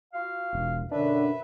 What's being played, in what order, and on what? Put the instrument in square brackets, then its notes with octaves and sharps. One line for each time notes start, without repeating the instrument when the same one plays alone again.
[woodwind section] F4 F#4 F5
[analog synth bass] E1
[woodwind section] F#2 B2 D3 [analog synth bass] D4 [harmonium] B4 E5